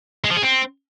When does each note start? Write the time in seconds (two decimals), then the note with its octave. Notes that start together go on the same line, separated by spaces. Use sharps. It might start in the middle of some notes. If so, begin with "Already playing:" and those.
0.24 G#3
0.30 F3
0.36 G#4
0.42 C4